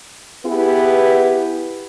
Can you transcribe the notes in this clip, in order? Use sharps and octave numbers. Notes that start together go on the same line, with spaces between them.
B3 E4 G4 G#4 B4